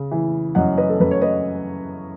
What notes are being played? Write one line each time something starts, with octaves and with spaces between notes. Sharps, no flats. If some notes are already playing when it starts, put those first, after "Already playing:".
Already playing: C#3
E3
F#2 D#5 F#5
B4 D#5
A4
F#2 B4
C#5
B4 D#5